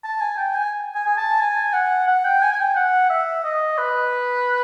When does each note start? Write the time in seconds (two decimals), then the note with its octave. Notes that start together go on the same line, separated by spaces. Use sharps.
0.04 A5
0.21 G#5
0.37 G5
0.55 G#5
0.95 G#5
1.06 G#5
1.17 A5
1.40 G#5
1.73 F#5
2.08 F#5
2.24 G5
2.42 G#5
2.53 G#5
2.59 G5
2.76 F#5
3.10 E5
3.44 D#5
3.78 B4